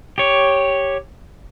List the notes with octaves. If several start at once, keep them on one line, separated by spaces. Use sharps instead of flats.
G4 C#5